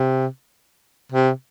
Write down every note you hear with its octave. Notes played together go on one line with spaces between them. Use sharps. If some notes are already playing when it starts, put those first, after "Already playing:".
Already playing: C3
C3